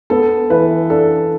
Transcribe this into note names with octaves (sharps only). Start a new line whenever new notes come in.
B3 A4
E3 B4
D4 A4